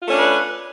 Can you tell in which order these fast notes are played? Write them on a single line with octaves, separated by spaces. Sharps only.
F4 A3 C#4 D4 B4